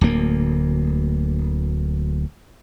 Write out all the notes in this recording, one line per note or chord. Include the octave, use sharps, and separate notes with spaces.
D1 D2 A#3